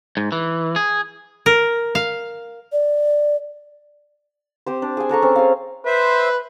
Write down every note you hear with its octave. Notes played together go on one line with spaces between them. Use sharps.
G#2
E3
G#4
A#4
F5
D5
C4 G4 C5
D4
G#4 G#5
D4 A4 A#5 C#6
C4 C#4
G#4 F5
B4 C5 E5